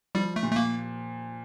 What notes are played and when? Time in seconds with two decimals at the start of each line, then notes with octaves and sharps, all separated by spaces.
0.15 F3 G3
0.36 A3
0.43 A#2
0.52 A3
0.56 A#3